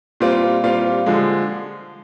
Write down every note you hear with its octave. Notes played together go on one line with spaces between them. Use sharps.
A#2 G3 C4 F4
A#2 G3 C4 F4 F5
D3 F3 G#3